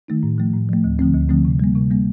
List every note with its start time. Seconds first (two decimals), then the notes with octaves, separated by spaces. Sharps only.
0.08 D#3 A3 D#4
0.23 A2
0.38 F3 A3
0.53 A2
0.69 F3 A3
0.84 D2
0.99 D3 F3 A3 C4
1.14 D2
1.29 D3 F3 A3 C4
1.45 C3
1.60 G3 A#3
1.75 C3
1.91 G3 A#3